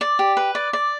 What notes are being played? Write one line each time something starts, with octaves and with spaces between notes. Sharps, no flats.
D5
G4
B4
D5
D5